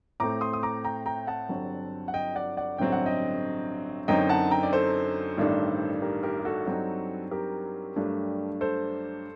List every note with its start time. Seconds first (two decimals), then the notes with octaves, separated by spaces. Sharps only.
0.20 A2 A3 C4 A#5 D6
0.41 C6 D#6
0.53 D#6
0.63 A#5 D6
0.84 G5 A#5
1.06 G5 A#5
1.27 F#5 A5
1.49 G1 G2 F#3 C4
2.08 F#5
2.14 D#5 G5
2.35 D5 F#5
2.57 D5 F#5
2.78 A1 G2 D3 F#3 C4 G5
2.92 F#5
3.06 D#5 G5
4.08 F#2 D3 F#3 C4 D#4 D#5 G5
4.29 F#5 A5
4.51 G5 A#5
4.63 D5
4.73 A4 C5
5.38 A1 G2 D#3 A3 D4
6.02 G4 A#4
6.23 G4 A#4
6.40 G4
6.45 F#4 A4
6.67 G2 F#3 C4 D#4
7.31 G4 A#4
7.96 G2 F#3 A3 D4
8.61 A4 C5